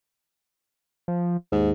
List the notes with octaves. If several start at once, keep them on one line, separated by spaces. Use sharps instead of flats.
F3
D#2 G#2